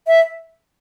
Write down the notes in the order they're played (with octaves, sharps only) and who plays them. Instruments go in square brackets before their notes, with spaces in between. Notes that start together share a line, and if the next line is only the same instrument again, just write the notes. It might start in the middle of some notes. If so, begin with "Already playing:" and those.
[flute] E5